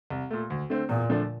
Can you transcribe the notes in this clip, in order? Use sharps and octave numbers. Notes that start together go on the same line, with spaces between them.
C2
A#2 A3
D2
D3 A3 C4
E2 A#2
D3 F3 A3 D4